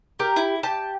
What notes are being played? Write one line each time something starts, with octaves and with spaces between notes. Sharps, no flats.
G4 A#4
E4
G4 A5